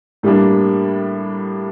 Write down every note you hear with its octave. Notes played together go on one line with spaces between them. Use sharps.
A2 G3 A#3 D4